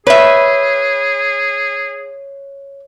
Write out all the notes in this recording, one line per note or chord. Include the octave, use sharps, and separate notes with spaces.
G#4 B4 C#5 E5